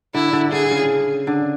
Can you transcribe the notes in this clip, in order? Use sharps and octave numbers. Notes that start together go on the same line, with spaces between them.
D3 E4
D3
D3 G#4
C#3
D3